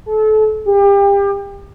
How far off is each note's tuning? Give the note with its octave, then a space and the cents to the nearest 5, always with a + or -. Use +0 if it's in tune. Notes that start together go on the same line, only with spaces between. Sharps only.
A4 -30
G4 +30